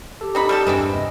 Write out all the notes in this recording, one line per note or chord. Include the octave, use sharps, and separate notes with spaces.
G4 A4
C4 D#4 B5
G3 A3 A4 D#6 F6 G6
E2 G2 E3 G#3 C4
D#2 C3 D#5